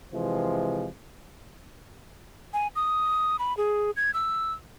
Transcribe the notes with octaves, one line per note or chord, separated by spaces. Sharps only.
C3 E3 F3 G#3
G#5
D#6
B5
G#4
G#6
E6